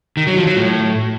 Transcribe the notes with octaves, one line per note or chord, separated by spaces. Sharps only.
D#3
F#3
F3
F#3
A2